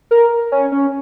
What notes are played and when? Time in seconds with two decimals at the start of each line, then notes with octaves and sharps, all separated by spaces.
0.11 A#4
0.52 C#4
0.72 C#4